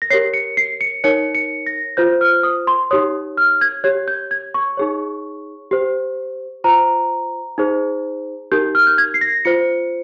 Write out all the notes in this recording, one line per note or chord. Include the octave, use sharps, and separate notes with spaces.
A#6
G4 A#4 C#5 C7
C#7
C7
C#7
D#4 A#4 C#5 C#7
C#7
A#6
F4 C5 G6
F6
D#6
C6
D#4 G4 C#5 D#6
F6
G#6
G4 C#5 G#6
G6
G#6
C#6
D#4 G#4 C#5
G4 C5
F4 C5 A#5
D#4 G#4 C5
D#4 G4 A#4 G6
F6
G6
G#6
C7
A#6
F4 C5 C#7